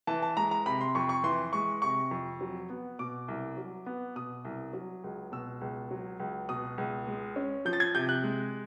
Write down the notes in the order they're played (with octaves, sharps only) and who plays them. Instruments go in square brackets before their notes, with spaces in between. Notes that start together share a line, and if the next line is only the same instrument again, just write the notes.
[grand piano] E3 A5
A5
G#3 A#5
A#5
C3 B5
C6
F2 C#6
C#6
E3 C6
G#3 C#6
C3 C#6
F2
F#3
B3
B2 D6
C2
F#3
B3
B2 D#6
C2
F#3
C#2
B2 E6
C#2
F#3
C#2
B2 D#6
C#2
G#3
C#4
F3 G6
A6
G#6
C3 G6
F#6
G#3